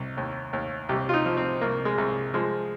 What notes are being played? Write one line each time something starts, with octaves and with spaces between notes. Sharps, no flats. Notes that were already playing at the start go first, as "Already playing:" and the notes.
Already playing: C2
D#2
D#2
C2 G4
F4
D#4
F3
C4
C2 A#3
G#3
C2
F3 G#3